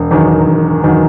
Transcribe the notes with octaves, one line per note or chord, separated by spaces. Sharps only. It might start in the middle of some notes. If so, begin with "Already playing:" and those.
Already playing: E1
E2 D#3 F#3
E1
E2 D#3 F#3